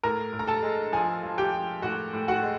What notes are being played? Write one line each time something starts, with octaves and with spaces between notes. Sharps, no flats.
A2 A#4 A#5
A2
A#5
A4 A5
G#3
F3 G#4 G#5
F3
G4 G5
F3
A2 F#4 F#5
A2
F#4 F#5
G#3